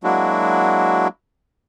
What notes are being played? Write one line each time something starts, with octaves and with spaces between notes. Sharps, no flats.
F#3 G#3 A#3 D4 E4 F#4